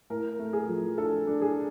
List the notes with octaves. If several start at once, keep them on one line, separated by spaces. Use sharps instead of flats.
A2 A#4
A3
G#4
F3
D4 A4
D4
G#4